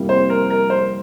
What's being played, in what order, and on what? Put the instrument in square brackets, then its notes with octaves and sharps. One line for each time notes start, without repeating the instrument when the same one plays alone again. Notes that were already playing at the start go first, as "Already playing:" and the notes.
Already playing: [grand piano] F2 C3 G3 A#3 E4
[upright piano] C5
A#4
A#4
C5